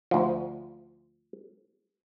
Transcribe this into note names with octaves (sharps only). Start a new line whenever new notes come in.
D2 F3